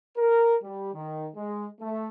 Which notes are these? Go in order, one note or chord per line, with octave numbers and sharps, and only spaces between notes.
A#4
G3
D#3
G#3
A3